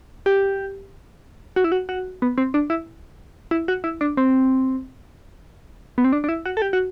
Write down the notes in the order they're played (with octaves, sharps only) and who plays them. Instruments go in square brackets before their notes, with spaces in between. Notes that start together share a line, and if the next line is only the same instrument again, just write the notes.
[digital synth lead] G4
F#4
E4
F#4
F#4
B3
C4
D4
E4
E4
F#4
E4
D4
C4
B3
C4
D4
D4
E4
F#4
A4
G4
F#4